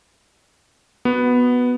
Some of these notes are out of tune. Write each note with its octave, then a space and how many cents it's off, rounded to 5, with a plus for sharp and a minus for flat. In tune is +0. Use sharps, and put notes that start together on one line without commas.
B3 +0 F#4 -5